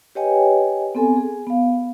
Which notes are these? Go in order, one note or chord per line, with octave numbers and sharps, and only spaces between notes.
G4 B4 C#5 D#5 G5 G#5
B3 C4 A4 G#5
G#4
B3 F5